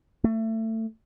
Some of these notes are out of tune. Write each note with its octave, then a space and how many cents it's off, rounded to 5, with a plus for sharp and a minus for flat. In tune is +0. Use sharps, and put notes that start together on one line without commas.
A3 +25